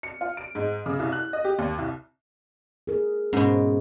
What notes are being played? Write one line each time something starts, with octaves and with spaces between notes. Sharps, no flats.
C#7
F4
D7
G#2
C#3
C2
F#6
D#5
G4
D#2
C2
G#4 A#4
G#2 B2 C#4